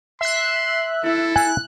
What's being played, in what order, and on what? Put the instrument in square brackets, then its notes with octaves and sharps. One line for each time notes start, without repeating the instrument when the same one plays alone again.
[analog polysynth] E5 F#6 [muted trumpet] C6
[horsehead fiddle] E4 [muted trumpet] A4
[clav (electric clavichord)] G#5 [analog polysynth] F#6